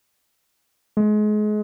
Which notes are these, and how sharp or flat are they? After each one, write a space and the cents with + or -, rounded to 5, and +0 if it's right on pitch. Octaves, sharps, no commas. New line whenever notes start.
G#3 +30